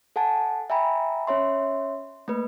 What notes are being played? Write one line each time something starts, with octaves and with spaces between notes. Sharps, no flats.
A4 F#5 G#5 A5
E5 G5 G#5 A#5 B5
C#4 C#5 E5 C6
A3 A#3 B4